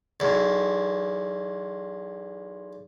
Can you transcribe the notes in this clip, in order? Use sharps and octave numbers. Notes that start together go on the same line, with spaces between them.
B1 E2